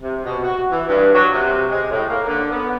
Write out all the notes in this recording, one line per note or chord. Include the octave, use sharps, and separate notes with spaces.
C3
B2
F#4
E3
G2
F#3
C3
G#3
A2
A#3
D3
B3